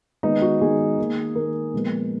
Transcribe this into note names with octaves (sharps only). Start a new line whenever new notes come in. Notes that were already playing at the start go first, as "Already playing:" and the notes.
D#3 G#3 B3 D#4
F#4
D#3 G#3 B3 G#4
D#3 A#3
D#3 A#3 A#4
A#2 F3 G#3 B3